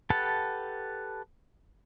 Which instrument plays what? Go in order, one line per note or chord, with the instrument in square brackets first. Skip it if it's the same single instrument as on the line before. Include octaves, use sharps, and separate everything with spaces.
[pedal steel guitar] G4 A4 B4 F#5 A5